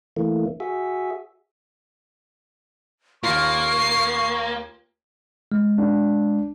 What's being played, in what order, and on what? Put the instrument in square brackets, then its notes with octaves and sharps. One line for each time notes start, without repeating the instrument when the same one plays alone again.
[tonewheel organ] E3 A3 A#3
F#4 G#4 E5
[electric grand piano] D#2 F4 [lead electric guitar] A#3 [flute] C#6 [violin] C7
[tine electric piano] G#3
[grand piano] D4